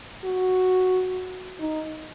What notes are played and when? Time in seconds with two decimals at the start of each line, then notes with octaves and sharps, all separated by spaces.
0.25 F#4
1.60 D#4